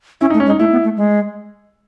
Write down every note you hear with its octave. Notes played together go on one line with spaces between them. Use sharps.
C#4 E4
D#4
A3
C#4
G#3
D#4
A3 E4
B3
A3
G#3